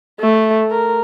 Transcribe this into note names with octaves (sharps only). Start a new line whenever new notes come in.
A3
A#4